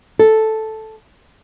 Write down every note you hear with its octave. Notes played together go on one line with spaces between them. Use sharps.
A4